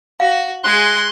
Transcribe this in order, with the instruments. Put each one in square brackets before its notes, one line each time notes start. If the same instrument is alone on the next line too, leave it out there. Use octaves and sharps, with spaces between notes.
[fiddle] F#4 [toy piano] F5
[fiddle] G#3 G#5 [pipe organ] C6 F#6